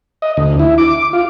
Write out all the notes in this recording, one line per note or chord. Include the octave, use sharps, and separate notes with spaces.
D#5
D2
E4
D6
F4